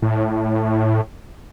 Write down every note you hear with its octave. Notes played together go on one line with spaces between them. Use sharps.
A2